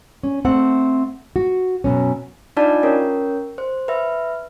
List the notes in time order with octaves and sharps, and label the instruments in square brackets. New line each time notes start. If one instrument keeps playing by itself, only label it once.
[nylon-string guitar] C#4
A3 C4 F#5
F#4
F#2 B2 C#4
[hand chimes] D4 D#4 F4 D5 A5
C#4 A#4 C#5
C5
B4 E5